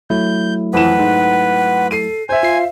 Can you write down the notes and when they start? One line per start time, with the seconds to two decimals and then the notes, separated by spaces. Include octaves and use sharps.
0.10 F#3 A3 E4 G6
0.73 F2 E3 B4 F#5 E7
0.99 G#2
1.91 A4 C7 D#7
2.29 C5 E5 G#5
2.43 F4 F5 C7